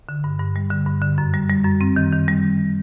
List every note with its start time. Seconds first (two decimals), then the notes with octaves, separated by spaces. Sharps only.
0.09 D3
0.24 G2
0.40 G2
0.56 G3
0.70 D3
0.87 G2
1.02 D3
1.18 F#2
1.34 G3
1.49 G3
1.65 F#2
1.81 C4
1.96 D#3
2.12 D#3
2.28 G3